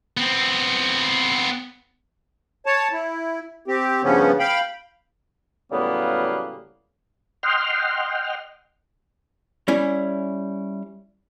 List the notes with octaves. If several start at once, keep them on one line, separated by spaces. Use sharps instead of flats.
B3 C4
C#5 A5
E4
C4 G4
G2 C#3 F3 B3 C#4
F5 G5 B5
A2 C#3 F#3 G3 A#3 B3
D#5 F#5 G5 C6 F6
G3 C#4 E4